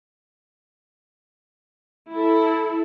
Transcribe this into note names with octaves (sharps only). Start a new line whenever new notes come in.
E4 A4